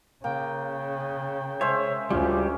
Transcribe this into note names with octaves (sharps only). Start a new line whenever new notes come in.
C#3 A#3 G5
G#3 C5 C#5 E5
D2 C#3 G3 C#4 F4 G4